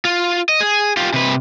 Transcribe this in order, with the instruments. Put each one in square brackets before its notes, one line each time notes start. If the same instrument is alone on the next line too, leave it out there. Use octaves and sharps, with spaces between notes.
[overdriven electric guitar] F4
D#5
G#4
F4 G4
C3 B4